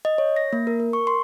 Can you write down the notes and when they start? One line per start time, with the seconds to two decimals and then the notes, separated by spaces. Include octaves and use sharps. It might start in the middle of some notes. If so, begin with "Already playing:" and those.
0.05 D#5
0.18 C#5
0.36 A#6
0.53 A#3
0.67 A#4
0.80 A#4
0.93 C#6
1.07 C6